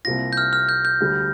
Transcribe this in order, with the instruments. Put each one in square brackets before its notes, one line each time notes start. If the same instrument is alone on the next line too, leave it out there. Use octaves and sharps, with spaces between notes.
[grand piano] C2 C3 A#3 F4 [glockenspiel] A#6
[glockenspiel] G6
F6
F6
G6
G6
[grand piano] D2 D3 G3